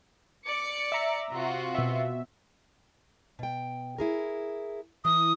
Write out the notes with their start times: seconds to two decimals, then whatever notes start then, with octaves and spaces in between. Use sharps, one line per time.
0.45 D5 D6 C#7
0.92 E5 A#5
1.31 C3 F4 F#4
1.75 B2 E5
3.39 B2 G5
3.98 E4 G#4 A#4
5.05 E3 D#6